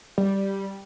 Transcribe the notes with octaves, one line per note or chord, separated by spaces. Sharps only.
G3